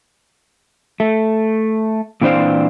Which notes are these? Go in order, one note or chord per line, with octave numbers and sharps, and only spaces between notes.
A3
A#2 E3 C4 D4 C5 F5